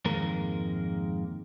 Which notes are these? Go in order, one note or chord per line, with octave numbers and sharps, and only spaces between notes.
F2 G#2 D#3 G#3 A#3 A#4